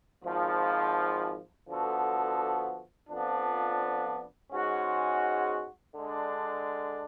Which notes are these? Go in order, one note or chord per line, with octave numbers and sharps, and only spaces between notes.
G#1 G#2 F3
D3 F3 B3 F#4 A4
F2 F3 B3 D4
G#2 G#3 C#4 F#4
D3 G#3 D4